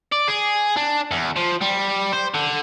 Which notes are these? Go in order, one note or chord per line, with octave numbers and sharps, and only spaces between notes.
D5
G#4
D4
E2
F3
G3
C5
D3